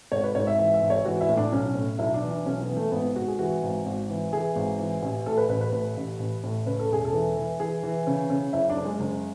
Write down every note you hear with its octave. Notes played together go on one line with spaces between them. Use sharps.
G#1 C#5
B4
G#2 C#5
E5
E3 E5
E5
G#1
C#5
E3 F#4
E4
A2
D4
B1 C#4
A2
B1 E4
D4
E3
D4
B1 C#4
B3
E3
A3
G#1 B3
G#1 F#4
G#4
E3 F#4
G#1
G#1
E3
E3 G#4
G#1
E3
A1
A2 A4
B4
A1 B4
B4
A2
A1
A1
A2
C#3 B4
A4
E1 G#4
A4
E3
E3
E3 G#4
E3
C#3
C#3
F#1 E4
D4
F#1
G#3
F#1